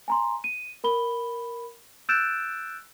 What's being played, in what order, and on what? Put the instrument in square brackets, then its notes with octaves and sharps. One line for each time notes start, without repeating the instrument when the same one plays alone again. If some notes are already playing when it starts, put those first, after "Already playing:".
[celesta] G#5 A#5 C6
D#7
A#4 B5 G7
E6 F#6 G6 A6 D7 E7